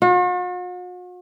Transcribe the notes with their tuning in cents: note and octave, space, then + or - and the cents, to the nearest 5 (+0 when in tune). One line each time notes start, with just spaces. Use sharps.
F#4 -45